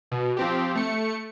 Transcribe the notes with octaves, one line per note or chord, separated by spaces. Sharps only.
B2
F3 C4 G4
A3 C#7